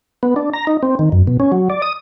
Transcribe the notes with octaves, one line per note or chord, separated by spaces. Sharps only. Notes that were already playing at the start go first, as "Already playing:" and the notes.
B3
D4
A#5
D#4
C4
D#3
F#2
B2
C#4
F#3
D5
D#6